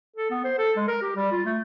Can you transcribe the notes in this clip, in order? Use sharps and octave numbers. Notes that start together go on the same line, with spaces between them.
A4
B3
C5
A4
G#3
A#4
G4
G3
F4
A3